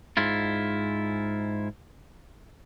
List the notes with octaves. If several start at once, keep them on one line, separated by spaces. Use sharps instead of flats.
G#2 E4 F4